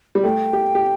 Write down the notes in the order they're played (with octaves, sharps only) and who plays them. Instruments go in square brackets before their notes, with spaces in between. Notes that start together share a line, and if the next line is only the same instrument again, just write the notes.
[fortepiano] G3
[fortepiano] A3 [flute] G5
[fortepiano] G4
G4